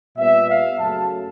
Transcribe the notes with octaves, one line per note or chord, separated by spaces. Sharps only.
A#2 G3 B3 E5
F5
F#2 C#3 F#3 A3 C#4 A5